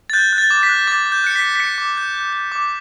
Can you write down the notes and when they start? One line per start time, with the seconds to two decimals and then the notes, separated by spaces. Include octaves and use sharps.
0.10 A6
0.13 F#6 G6
0.33 F#6
0.38 A6
0.51 D6
0.63 B6
0.69 F#6
0.87 D6 A6
1.06 D6
1.12 G6
1.24 F#6 C#7
1.36 B6
1.43 F#6
1.56 B6
1.60 G6 C#7
1.78 D6
1.97 G6
2.15 G6
2.33 G6
2.52 D6